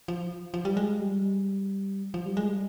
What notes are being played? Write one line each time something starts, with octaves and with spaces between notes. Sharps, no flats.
F3
F3
G3
G#3
G3
F3
G3
G#3
G3